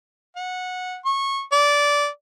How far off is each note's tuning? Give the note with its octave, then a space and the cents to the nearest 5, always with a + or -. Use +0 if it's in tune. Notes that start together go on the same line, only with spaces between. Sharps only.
F#5 -15
C#6 -20
D5 -15